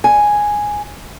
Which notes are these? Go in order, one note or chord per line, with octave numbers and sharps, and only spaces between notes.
G#5